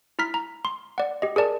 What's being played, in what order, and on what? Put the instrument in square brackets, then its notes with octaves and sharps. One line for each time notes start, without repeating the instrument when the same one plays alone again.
[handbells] E4 A#5 F6 B6
A#5
C6
D5 F#5
G4 D#5
G#4 A#4 D5 A5